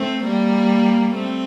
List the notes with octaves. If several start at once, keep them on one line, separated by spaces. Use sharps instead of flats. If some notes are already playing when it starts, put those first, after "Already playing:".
Already playing: A3 C4
G3 A#3
A3 C4